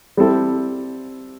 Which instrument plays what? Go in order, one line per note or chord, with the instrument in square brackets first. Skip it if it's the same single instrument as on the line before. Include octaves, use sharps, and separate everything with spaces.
[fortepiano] G3 C4 E4 A4